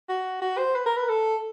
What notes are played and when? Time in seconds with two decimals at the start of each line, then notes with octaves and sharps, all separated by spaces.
0.09 F#4
0.42 F#4
0.58 C5
0.75 B4
0.86 A#4
0.97 B4
1.09 A4